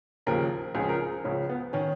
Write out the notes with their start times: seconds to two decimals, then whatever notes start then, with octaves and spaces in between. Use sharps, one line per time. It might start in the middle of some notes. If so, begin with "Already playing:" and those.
0.26 D#2 C#3 F3 A#4
0.75 C#2 C#3 F3 G#4
0.89 A#4
1.01 G#4
1.24 C#2 C#3 F3 C#4
1.49 B3
1.73 D#3 C#4